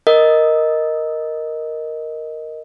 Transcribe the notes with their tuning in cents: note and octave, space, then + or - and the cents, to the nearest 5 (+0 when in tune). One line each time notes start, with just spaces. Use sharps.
A#4 +0 D#5 +5 D#6 -5